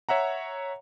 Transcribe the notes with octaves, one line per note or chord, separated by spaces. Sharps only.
C#5 E5 F#5 A#5